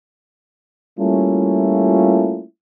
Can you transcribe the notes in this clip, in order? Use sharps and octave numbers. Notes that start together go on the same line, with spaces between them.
G3 A3 A#3 C#4 E4 F4